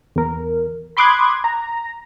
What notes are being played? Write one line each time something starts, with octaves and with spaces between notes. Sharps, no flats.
E2 A#4
B5 C6 D6 D#6 F#6 G#6
A#5